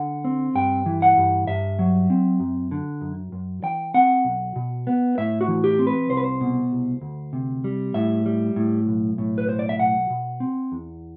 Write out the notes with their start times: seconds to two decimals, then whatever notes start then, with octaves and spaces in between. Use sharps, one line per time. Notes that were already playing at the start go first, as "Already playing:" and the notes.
Already playing: D3 F#5
0.25 C4
0.55 G2 G5
0.86 E3
1.02 F#5
1.17 G2
1.47 G2 E5
1.79 F#3
2.10 C4
2.40 F#2
2.71 D3
3.01 F#2
3.32 F#2
3.63 E3 G5
3.94 C4 F#5
4.25 B1
4.56 B2
4.87 B3
5.18 A2 E5
5.41 F#4
5.48 E3
5.64 G4
5.79 C4
5.87 B4
6.10 C2 C5
6.17 B4
6.24 C5
6.41 B2
6.71 C2
7.02 D2
7.33 C3
7.64 G3
7.94 A2 E5
8.26 G3
8.56 A2
8.87 B1
9.18 A2
9.38 B4
9.49 B1 C5
9.59 D5
9.69 E5
9.79 B1 F#5
10.10 B2
10.40 C4
10.72 E2